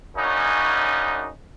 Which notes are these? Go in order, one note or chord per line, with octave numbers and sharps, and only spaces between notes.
F#2 C#3 D4 D#4